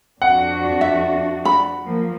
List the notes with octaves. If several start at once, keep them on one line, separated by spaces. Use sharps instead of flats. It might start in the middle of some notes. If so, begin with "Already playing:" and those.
F2 D4 F#4 F#5
E5
B5
F3 A#3